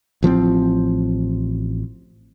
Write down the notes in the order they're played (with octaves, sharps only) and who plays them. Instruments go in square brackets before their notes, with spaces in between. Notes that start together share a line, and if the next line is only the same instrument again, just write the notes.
[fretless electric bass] A1 F3 A3 C4